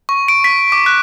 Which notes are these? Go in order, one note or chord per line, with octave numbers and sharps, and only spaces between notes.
C#6
D7
B6
D6
F#6